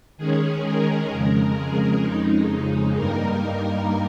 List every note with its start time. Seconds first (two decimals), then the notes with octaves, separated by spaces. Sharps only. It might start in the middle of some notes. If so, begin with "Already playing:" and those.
0.17 D#3 G#3 C#4 G#4
0.63 A#4
1.09 F2 C#3 G#3
1.56 G#4
2.02 F2 C#3 G#3 D#4
2.94 G2 G3 A#3 D#4 A#4